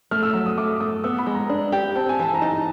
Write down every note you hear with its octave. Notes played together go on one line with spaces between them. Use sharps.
A3 F6
E6
F#3
D#6
A3 D6
A3 D#6
B3 E6
B5
G#3
A#5
D4
G4
C4 A5
G#5
E3 A5
A#5
D#4 A5